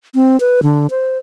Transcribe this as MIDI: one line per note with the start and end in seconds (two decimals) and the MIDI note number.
0.15 0.39 60
0.40 0.61 71
0.63 0.87 50
0.90 1.18 72